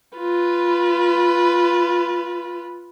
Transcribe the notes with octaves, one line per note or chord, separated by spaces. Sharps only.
F4 B4